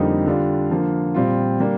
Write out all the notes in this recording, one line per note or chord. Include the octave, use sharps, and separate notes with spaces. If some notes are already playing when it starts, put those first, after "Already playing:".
Already playing: F2 D3 G3 A#3 D#4
D3 G3 D4 F4
D3 F3 A#3
A#2 G3 C4 F4
D3 G3 A#3 D4